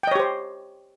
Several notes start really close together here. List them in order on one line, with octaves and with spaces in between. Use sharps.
G5 D#5 C#5 G4 C5